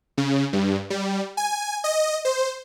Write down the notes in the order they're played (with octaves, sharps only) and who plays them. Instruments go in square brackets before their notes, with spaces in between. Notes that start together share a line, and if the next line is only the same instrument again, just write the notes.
[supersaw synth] C#3
G2
G3
G#5
D#5
C5